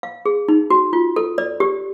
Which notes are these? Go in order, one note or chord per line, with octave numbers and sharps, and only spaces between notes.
F5
G#4
D#4
F#4
F4
A4
D5
G4